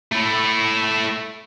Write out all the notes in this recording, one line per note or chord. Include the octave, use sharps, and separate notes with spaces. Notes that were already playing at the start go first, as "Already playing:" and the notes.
A3 E4